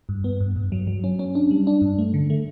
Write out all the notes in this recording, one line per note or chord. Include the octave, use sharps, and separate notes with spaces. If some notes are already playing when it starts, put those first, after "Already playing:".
G2
B3
G2
G2
F#3
F#3
C#4
C#4
D4
G3
D4
G2
A3
D3
A3